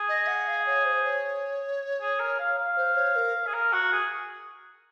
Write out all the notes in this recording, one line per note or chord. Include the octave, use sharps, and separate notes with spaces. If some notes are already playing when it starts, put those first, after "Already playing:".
Already playing: G#4
D#5
F#5
F5
C#5
C5
C#5
G#4
A#4
F5
F5
C5
C#5
A#4
G#4
A#4
F#4
G#4